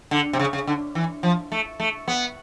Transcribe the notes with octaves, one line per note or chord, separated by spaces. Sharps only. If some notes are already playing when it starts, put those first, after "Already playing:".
D3
C3
C#3
C#3
D3
E3
F3
A3
A3
B3